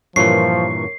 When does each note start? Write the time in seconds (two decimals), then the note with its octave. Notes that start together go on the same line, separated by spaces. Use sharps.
0.16 G2 A#2 E3 F3 A#4 C#5 C#6 C7